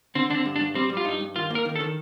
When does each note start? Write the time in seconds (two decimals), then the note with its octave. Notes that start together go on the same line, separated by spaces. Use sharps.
0.15 D3 C4
0.30 D3 D4
0.35 C4
0.45 G2
0.56 D4
0.60 G2
0.75 G3 C4
0.90 G3
0.97 F4
1.05 G2 D#4
1.21 G2
1.35 D#3 F4
1.50 A#3 A#4
1.65 D#3
1.76 A4
1.80 D#3